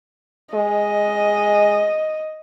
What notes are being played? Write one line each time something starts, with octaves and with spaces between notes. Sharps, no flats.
G#3 D#5